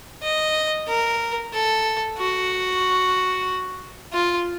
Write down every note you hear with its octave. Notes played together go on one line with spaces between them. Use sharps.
D#5
A#4
A4
F#4
F4